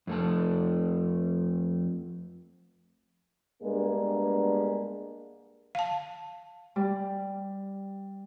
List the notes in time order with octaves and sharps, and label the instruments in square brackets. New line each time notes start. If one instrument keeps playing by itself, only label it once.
[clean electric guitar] F2 A3 A5
[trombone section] G2 G#3 A#3 B3 D4 A#4
[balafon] F5 A5
[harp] G3